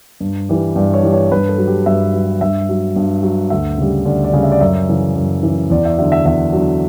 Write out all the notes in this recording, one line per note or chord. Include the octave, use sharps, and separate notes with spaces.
G2
E3 G3
G2 D5
C#5
E3 G3
C#5
G2 B4
A4
F#3
G4
G2 E5
F#3
G2 E5
F#3
G2
F#3
D2 E5
C#3 G3
D2 D5
D5
C#3 G3
E5
D5
F#2 E5
C#3 E3
F#2
C#3 E3
E2 D5
E5
D3 F#3 E5
E5
E2 E5
D3 F#3